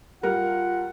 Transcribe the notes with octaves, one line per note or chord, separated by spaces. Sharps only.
G3 F4 A#4 F#5